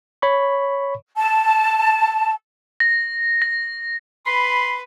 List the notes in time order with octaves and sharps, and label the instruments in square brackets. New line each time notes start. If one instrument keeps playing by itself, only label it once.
[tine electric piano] C#5 B5 C#6
[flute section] A5
[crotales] A#6
A#6
[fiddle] B4 [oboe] B5 [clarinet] C6